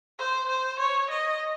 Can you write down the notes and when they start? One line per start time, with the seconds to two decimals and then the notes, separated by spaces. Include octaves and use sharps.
0.19 C5
0.49 C5
0.79 C#5
1.10 D#5